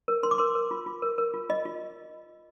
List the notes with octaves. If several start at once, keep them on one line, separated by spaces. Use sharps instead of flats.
A#4
A#4 C6
D6
A#4 C6
A#4
F4
F4
A#4
A#4
F4
F4 D#5
F4